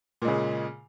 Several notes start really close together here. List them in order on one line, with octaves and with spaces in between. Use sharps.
A#2 G#3 C#3